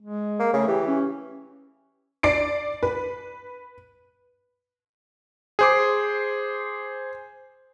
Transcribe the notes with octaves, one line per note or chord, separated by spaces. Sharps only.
G#3
A#3
C#3 A3
E3 G4
C#4
D5 C7 D7
B4
G#4 C5 D6